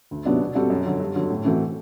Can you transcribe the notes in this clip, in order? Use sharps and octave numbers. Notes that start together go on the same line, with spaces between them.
D2
C3 F#3 B3 D4
B2
G3 C4 F#4 A4
F#2
D3 F#3
G2
D3 F#3
A2
E3 A3 C4 F#4